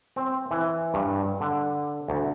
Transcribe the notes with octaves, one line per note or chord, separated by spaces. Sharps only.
C4
E3
G2
D3
D2